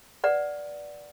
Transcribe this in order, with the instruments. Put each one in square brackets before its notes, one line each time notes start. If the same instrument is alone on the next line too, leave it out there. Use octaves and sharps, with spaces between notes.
[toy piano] B4 D5 F#5